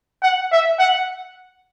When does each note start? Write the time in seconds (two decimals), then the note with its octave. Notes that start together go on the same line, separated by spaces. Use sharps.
0.22 F#5
0.51 E5
0.79 F#5